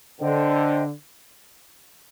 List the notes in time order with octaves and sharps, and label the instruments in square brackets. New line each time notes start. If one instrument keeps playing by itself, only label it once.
[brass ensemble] D3 [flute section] C5 D#5 G5